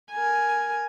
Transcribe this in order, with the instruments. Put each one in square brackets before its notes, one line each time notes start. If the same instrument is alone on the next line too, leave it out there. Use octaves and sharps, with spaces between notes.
[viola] A#4 G#5